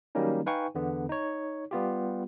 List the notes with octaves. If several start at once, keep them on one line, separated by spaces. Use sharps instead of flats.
D#3 F#3 G3 A#3 C#4 D#4
D#4 B4 F5 G5 G#5 C#6
E2 D3 B3
D#4 C#5
G3 B3 F4 G4